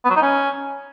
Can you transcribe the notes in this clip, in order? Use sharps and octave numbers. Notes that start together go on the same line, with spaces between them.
B3
F#3
D#4
C#4